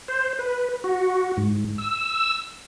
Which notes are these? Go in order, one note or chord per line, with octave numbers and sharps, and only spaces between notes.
C5
B4
F#4
G#2
E6